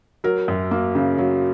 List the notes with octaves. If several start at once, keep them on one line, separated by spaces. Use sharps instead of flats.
F#3 A#4
F#2
A#3
C#3
F#3